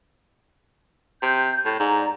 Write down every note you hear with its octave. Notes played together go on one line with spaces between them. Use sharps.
C3 G6
A2
G#2 D5 A#5